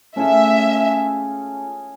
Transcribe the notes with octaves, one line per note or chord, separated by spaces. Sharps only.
A3 C#4 F4 G#4 E5